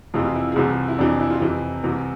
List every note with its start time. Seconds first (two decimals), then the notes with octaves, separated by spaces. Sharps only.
0.14 F2 C3 E3 F4
0.26 F4
0.35 E4
0.52 G#4
0.56 C2 C3 E3 F4
0.88 E4
0.98 F2 C3 E3 D4
1.20 E4
1.30 F4
1.41 F2 C3 E3 E4
1.84 C2 C3 E3